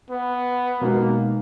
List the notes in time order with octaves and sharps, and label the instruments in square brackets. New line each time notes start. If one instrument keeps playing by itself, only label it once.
[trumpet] B3
[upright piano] B2 G#3 B3 D#4 F#4 [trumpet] A#3